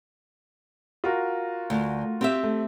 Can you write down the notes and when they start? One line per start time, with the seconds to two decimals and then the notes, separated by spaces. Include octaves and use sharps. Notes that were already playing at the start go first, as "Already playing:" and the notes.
1.04 F4 F#4 A#4
1.70 D2
2.21 C4 G4 E5
2.43 A3